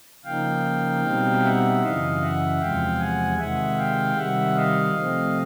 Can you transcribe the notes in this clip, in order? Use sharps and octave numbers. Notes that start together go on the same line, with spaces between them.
C#3 F3 A#3 D#4 F5 G5
B2 G3 C4 D#4
E5 F#5
F#2 C#3 E3 D#5 F5
E5 F#5
E2 C3 F3 G#3 F5 G5
F#5 G#5
C3 D#3 G#3 E5 F#5
F5 G5
C3 D#3 G3 E5 F#5
D#5 F5
C3 F3 A3 C4